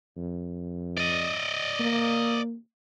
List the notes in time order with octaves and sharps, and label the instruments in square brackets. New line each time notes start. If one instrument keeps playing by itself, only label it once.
[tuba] F2
[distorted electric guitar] D5 D#5
[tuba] A#3